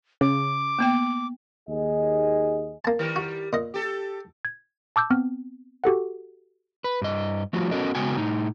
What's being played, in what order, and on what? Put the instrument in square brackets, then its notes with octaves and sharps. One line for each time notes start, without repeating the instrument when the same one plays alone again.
[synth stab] C#3 [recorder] D6
[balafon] A#3 B3 G5
[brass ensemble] D#2 G#4 D#5
[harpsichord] A#3 A5
[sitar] D#3 G3 A#4
[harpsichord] F#4
A#2 D#5
[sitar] G4 A4
[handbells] G#6
A5 D6 E6 G6
B3 C4 F6
F#4 G4 A4 F#5
[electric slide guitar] B4
G2 D#5
F3 A3 F4 F#4
B3 C#4 F#4 A4 A#4 D#5
C#3 G#3 B3 F#4 G5 G#5
A2 D#4